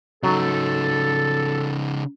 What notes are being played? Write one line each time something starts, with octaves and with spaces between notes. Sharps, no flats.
C#3 F#3 D#4 A4